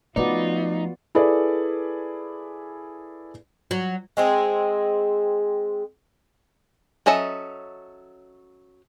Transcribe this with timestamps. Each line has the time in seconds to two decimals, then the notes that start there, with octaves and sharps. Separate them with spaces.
0.16 F3 A3 B3 D#4 F4 F#4 B4 D5
1.15 E4 G#4 A4 B4 D5
3.71 F#3
4.17 G#3 C4 G#4
7.06 F#3 C#4 A4 D#5 E5